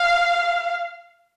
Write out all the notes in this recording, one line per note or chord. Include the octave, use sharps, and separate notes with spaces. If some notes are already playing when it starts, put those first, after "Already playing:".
Already playing: F5